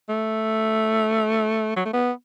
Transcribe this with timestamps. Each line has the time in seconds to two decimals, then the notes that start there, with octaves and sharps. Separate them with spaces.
0.09 A3
1.76 F#3
1.85 A3
1.93 B3